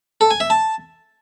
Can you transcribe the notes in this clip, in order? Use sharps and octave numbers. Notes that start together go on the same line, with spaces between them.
A4
G#5
E5
A5